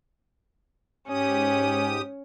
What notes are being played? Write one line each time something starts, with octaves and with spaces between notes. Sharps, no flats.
G#2 C#4 G4 D#6